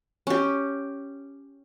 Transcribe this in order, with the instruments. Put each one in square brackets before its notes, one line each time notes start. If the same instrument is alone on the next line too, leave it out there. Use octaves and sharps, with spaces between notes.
[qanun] C#4 G4